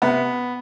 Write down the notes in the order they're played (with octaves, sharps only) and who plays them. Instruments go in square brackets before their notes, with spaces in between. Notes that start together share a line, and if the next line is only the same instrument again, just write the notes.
[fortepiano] C3 B3